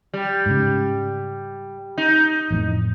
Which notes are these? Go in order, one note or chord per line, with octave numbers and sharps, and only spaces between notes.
G3
G#2 C#3
D#4
A1 F2 A2